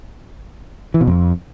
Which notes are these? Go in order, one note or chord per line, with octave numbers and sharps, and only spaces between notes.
E3
B2
F2